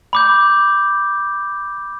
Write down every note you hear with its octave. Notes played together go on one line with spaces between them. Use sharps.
B5 D6 G6